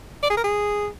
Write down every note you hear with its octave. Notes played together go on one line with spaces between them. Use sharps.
D5
G#4
A#4
G#4